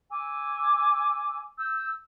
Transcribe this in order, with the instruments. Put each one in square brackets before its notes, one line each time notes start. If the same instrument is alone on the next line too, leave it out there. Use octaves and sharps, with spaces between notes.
[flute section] G#5 D6 E6
E6 G6